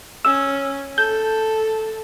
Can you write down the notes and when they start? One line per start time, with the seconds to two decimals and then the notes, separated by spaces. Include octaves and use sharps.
0.25 C#4 E6
0.98 A4 G6